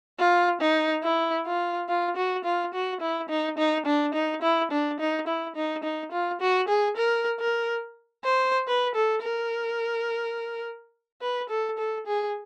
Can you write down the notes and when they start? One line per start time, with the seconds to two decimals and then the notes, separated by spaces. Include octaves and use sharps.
0.19 F4
0.61 D#4
1.04 E4
1.46 F4
1.89 F4
2.16 F#4
2.45 F4
2.74 F#4
3.01 E4
3.29 D#4
3.58 D#4
3.86 D4
4.14 D#4
4.42 E4
4.71 D4
5.00 D#4
5.27 E4
5.56 D#4
5.84 D#4
6.12 F4
6.41 F#4
6.69 G#4
6.97 A#4
7.40 A#4
8.24 C5
8.67 B4
8.95 A4
9.23 A#4
11.22 B4
11.50 A4
11.78 A4
12.06 G#4